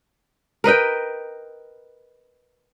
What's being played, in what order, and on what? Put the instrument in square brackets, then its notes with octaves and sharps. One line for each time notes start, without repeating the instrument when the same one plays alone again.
[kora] A#4 B4 D#5 G5